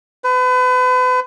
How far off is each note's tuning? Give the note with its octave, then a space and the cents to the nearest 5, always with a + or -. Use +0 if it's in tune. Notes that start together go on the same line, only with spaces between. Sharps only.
B4 +35